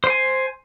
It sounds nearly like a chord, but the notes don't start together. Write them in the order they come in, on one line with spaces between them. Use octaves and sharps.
C5 C6 G#5